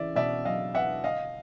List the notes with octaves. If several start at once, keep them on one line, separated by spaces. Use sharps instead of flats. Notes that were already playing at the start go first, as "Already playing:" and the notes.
Already playing: C#3 E3 D5 E5
B2 D5 E5
F#3 D#5 F5
B3 E5 F#5
D3 D#5 F5